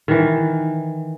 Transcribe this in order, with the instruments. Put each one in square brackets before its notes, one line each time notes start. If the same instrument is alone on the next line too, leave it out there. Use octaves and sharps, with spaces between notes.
[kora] D#3 E3